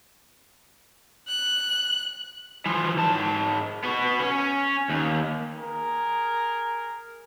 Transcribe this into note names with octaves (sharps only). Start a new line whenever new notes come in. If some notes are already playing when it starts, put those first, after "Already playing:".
F#6
E3 F3
G#2 A5
B3 F#4
C#4
D#2
G#4 A#4